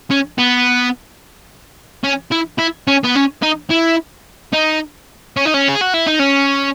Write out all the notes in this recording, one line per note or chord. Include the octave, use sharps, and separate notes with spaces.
C#4
B3
C#4
E4
E4
C#4
B3
C#4
D#4
E4
D#4
C#4
D#4
C#4
G#4
F#4
E4
D#4
C#4